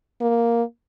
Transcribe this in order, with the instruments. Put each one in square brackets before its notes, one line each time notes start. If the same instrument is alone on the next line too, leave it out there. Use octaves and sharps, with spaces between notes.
[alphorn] A#3